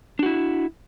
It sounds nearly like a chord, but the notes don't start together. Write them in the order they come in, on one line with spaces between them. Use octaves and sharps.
D4 F#4 E4